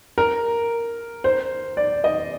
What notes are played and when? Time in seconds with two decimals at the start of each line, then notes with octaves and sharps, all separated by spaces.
0.18 A#4
1.24 C5
1.77 D5
2.04 D#5